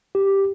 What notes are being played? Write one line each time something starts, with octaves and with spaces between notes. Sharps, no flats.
G4